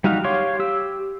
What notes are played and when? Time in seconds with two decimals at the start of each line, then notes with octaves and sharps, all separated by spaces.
0.04 G3 D#4 F#4 F5
0.24 G4 C#5 F5 C6 C#6
0.60 G4 E6